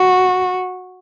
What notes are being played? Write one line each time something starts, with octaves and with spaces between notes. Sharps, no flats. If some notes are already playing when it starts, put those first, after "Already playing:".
Already playing: F#4